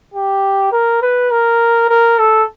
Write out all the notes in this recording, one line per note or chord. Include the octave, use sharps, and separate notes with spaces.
G4
A#4
B4
A#4
A#4
A4